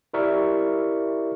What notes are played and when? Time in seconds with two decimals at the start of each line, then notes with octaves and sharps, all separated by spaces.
0.14 E4 G4 A#4 D5 E5 C#6